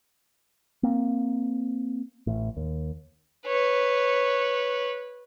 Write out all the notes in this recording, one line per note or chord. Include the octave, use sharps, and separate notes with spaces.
A#3 C4
A1 A2
D#2
B4 C#5